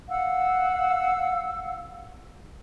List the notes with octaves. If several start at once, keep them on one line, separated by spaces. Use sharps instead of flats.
F5 F#5 E6